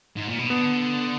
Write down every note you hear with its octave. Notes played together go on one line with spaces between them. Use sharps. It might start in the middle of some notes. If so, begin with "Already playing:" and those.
G#2
A#2
B2
D3 B3